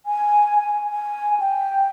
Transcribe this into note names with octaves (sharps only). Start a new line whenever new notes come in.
G#5
G#5
G#5
G5